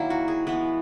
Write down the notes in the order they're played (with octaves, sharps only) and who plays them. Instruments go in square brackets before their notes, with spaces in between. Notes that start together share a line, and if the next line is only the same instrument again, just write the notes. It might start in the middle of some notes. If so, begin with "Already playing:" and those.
Already playing: [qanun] D#3 F#3 A#3 E4
F#4
G#4
E3 G#3 B3 B4